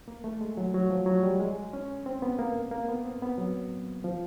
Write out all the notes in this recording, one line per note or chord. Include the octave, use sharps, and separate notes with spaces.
A#3
A3
G#3
F#3
F#3
F3
F#3
G3
G#3
C#4
C4
B3
A#3
A#3
B3
C4
B3
F#3
F3